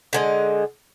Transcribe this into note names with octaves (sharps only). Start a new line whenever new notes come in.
D3 G#3 D#5